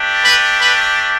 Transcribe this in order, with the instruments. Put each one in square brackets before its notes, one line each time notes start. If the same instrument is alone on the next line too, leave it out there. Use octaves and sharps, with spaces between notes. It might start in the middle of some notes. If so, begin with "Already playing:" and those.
Already playing: [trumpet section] A3 D4 G4
B4
B4